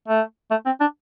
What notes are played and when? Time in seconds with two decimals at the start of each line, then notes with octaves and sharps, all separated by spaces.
0.08 A3
0.51 A3
0.66 C4
0.81 D4